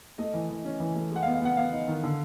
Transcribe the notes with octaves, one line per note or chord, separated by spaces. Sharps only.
A3 D#5
E3
E3
C#4
E3
A3
G#3 F#5
F5
B3
F5
B3 F#5
B3 F5
D#4
D#3
D3